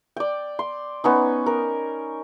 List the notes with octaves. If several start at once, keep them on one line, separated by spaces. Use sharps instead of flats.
D5 G5
C6
B3 C#4 D#4
A#4